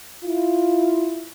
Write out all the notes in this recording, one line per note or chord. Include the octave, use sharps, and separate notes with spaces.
E4 F4